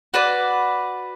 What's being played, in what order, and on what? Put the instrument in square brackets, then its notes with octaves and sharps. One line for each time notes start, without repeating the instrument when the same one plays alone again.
[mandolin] F#4 B4 D5